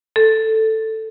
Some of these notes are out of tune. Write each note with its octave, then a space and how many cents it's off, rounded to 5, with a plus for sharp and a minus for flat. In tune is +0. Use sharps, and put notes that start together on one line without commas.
A4 +5